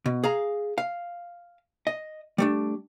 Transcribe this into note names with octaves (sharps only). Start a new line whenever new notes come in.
B2
G#4 F5 A#5
F5
D#5
G3 A3 D4